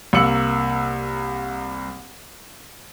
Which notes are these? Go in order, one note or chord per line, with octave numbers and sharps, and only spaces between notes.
C2 A#3 E6 C#7 F#7